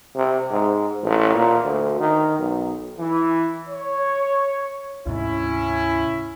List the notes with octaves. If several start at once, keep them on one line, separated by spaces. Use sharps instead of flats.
C3
G#2
A1
A#2
D2
D#3
B1
E3
C#5
D2 G#2 C3 C#4 E4